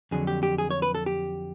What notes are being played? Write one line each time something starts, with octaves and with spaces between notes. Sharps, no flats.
F2 D3 F#3 G#4
G4
G4
G#4
C#5
B4
A4
G4